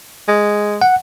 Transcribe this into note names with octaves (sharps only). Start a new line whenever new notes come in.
G#3
F#5